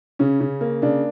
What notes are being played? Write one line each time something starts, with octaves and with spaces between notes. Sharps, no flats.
C#3 C#4
C#3
A#3
C#3 D4